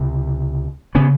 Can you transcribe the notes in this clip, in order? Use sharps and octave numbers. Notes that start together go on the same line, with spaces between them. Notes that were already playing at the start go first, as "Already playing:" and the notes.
Already playing: C#2 C3
C#3 B3 C#4